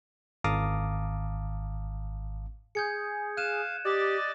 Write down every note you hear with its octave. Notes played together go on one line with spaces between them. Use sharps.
G#1 F5 A5 A#5 D6 D#6
G#4 G6 G#6 C#7
F5 F#6 D#7 E7
G4 D5 D#5 A6